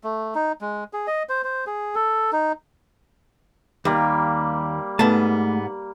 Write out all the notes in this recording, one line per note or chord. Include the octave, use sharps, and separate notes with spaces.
A3
D#4
G#3
G#4
D#5
C5
C5
G#4
A4
D#4
D#2 G3 A#3
G#2 A3 B3 A5